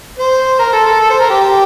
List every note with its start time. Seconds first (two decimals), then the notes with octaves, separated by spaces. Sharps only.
0.19 C5
0.59 A#4
0.73 A4
0.87 A4
1.00 A4
1.10 C5
1.21 A#4
1.31 G4